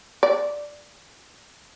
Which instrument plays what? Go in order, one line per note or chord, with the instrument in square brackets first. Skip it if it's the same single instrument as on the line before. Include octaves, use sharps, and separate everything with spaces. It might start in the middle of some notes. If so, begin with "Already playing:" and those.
[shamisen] D5